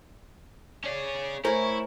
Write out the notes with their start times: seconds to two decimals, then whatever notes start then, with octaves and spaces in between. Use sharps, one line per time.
0.84 C#4 G#4 C#5 D5
1.45 A3 E4 A#4 C5 C#5 G#5